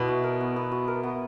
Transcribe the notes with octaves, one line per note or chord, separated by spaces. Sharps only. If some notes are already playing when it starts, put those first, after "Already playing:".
Already playing: B2 B3 E4 B4 D5
F#4
A#4
B3
B3
F#4
A#4
B3